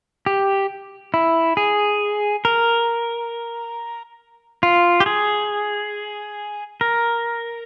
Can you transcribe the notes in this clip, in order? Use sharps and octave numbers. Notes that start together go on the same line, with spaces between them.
G4
E4
G#4
A#4
F4
G4
G#4
A#4